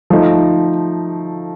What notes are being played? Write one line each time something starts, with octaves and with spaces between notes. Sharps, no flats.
F3 A3 D#4